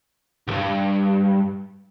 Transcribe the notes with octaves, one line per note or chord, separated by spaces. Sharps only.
C2 G2